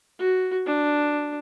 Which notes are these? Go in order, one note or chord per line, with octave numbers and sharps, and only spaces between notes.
F#4
D4